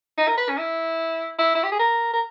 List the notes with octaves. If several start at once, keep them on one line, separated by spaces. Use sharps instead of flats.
D#4
A#4
B4
C#4
E4
E4
E4
G4
G#4
A#4
A#4